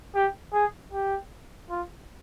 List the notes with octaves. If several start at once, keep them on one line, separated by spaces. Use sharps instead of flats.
G4
G#4
G4
F4